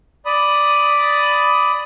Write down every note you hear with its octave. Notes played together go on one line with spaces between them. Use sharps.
D5 B5 D#6